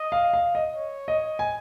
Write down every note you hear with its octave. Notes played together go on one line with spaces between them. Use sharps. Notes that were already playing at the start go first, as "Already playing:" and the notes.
Already playing: D#5
F5
F5
D#5
C#5
D#5
G#5